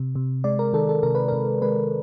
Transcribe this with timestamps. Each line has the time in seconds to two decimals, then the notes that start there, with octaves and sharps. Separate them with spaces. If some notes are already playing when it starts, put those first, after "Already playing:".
Already playing: C3
0.15 C3
0.44 G#3 D5
0.59 A#4
0.73 D#3 A4
0.89 A4
1.03 C3 A#4
1.15 B4
1.28 C3 A#4
1.62 G#3 B4